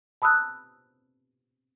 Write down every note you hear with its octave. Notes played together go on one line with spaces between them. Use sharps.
A5 B5 D#6 E6 F#6